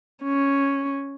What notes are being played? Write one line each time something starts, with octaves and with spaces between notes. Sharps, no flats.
C#4